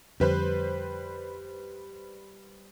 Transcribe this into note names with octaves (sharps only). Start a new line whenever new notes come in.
F2 D3 G3 B4 C5